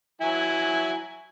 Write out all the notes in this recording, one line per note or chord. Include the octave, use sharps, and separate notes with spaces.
F#3 E4 G#5